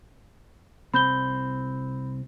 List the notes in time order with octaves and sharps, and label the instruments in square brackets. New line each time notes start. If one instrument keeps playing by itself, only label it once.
[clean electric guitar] C2 C4 [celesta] B5 G6 G7